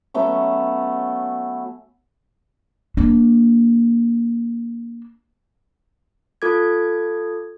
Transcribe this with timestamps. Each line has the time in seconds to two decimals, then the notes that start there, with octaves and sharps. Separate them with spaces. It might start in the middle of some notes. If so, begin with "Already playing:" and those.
0.14 F#3 A3 B3 C#4
2.97 A#3 D4
6.42 F4 A4 D6 G#6